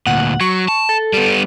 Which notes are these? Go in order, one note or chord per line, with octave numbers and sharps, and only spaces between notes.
D2 A#2 F#5
F#3 C#6
A5
A4
G3 B3